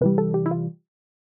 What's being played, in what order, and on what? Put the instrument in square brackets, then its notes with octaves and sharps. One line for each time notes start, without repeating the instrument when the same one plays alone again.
[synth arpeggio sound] C3 E3 G3 B4
A4
G4
E4
F4